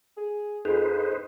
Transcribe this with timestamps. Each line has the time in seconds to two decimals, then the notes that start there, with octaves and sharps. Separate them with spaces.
0.17 G#4
0.65 F2 D#4 G#4 B4 C5